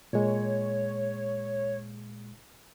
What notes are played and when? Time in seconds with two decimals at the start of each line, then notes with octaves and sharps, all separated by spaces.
0.13 A#2 G#3 C#5